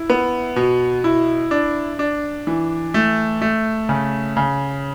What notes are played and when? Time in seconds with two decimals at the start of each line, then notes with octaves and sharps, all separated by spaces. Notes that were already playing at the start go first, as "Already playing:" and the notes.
Already playing: E4
0.10 B3
0.56 B2
1.04 E4
1.51 D4
1.99 D4
2.47 E3
2.94 A3
3.42 A3
3.89 C#3
4.37 C#3